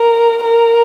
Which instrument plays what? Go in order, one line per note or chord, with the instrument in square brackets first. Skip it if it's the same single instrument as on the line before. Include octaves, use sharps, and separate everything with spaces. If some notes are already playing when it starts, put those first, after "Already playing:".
Already playing: [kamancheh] A#4
A#4